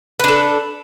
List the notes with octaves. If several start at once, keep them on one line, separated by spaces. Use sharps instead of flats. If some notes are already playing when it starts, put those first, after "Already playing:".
D4 A4 B4